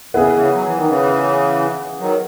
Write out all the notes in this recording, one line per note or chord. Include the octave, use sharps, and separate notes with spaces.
C#3 B3 E4 G#4
C#3 E3
F#3
E3
D#3
C#3 E3
D#3 F#3